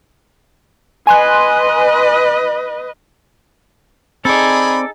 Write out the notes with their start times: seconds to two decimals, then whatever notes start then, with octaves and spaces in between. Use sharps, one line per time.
1.07 B4 D#5 G#5 C6 F#6
4.25 C4 D#4 G#4 A4 D5 B5